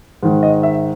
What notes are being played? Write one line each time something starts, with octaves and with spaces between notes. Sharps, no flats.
G#2 D#3
D#5
E5